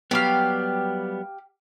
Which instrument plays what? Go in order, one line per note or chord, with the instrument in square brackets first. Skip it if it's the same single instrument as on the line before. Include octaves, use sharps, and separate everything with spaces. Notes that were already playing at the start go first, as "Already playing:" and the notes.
[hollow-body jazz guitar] F#3 G3 B3 [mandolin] G4 F5